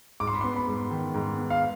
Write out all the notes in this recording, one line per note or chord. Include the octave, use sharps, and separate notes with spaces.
G#2 D6
C6
B5
C6
B3
B5
G#2
D#3
G#2
B3
F5